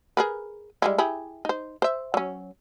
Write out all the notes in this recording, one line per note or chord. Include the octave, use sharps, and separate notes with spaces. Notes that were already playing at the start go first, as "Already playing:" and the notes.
G#4 A#4 B4
G3 G#3 E4
E4 G4 G#4
D#4 C5
C5 E5
F#3 C#4